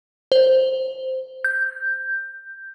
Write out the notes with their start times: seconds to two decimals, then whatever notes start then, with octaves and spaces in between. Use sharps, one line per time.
0.32 C5
1.44 G6